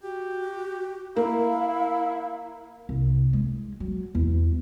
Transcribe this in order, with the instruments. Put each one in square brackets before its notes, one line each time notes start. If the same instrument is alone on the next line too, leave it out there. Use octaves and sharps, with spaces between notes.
[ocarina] F#4 [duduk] G4
[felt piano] A#3 [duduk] E4 [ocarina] F5
[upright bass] C2
G#3
F#3
E2